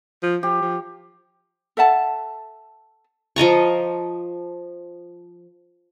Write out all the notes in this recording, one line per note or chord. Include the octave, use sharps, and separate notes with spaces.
F3
F3 G4
F3
A4 E5 F#5 A5
F3 D#5 A#5 C#6